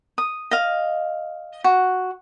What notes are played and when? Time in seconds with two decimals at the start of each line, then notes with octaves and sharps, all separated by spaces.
0.18 D#6
0.51 D#5 F5
1.64 F#4